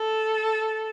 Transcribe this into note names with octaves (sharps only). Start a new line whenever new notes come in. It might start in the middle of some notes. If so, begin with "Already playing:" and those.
Already playing: A4